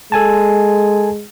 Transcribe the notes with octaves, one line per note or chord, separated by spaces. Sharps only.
G#3 A4 G#5 A5